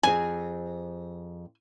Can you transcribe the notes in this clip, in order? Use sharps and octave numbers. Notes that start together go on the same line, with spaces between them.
F2 C4 G#4 G#5